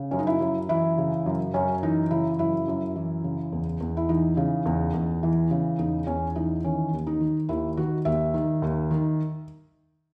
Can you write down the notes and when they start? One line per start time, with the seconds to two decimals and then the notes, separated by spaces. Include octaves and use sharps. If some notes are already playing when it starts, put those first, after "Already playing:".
Already playing: C#3
0.11 F#2 C#4
0.19 D#4
0.27 E4
0.41 F#2
0.69 E3 E4
0.98 C#3
1.26 F#2
1.54 F#2 C#4
1.83 E3 D#4
2.11 C#3 E4
2.39 F#2 E4
2.68 F#2
2.96 E3
3.24 C#3
3.52 E2
3.81 E2
3.97 E4
4.09 E3 D#4
4.37 C#3
4.66 E2
4.94 E2
5.23 E3
5.51 C#3
5.79 E2 D#4
6.07 E2 C#4
6.35 E3 D#4
6.64 D#3 C#4
6.93 D#2
7.07 D#4
7.21 D#3
7.49 D#2 E4
7.77 D#3 F#4
8.05 D#2 E5
8.34 D#3
8.62 D#2
8.91 D#3